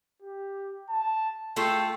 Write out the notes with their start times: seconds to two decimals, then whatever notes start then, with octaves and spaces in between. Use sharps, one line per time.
0.22 G4
0.89 A5
1.56 A3 F4 A4 G5